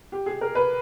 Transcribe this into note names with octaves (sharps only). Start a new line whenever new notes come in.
G4
G#4
A#4
B4